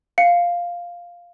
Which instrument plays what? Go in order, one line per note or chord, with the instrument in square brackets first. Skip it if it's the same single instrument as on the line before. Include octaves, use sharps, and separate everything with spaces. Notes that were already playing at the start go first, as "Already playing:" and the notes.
[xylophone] F5 C#7